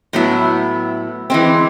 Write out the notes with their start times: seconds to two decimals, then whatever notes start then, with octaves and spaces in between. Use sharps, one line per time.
0.13 A2 F#3 B3 E4
1.30 E3 G#3 C4